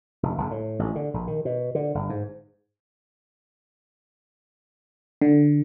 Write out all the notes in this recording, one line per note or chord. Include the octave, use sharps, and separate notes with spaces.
F1
F#1
A2
A1
D3
A#1
D#3
B2
D3
G1
G#2
D3